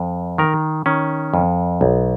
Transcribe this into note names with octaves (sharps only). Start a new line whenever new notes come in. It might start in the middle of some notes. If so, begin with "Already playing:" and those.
Already playing: F2
D#3 A#4
D#3 C#4
F2
B1